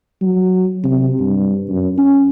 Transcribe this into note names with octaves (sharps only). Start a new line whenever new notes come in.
F#3
C3
G2
F#2
C#4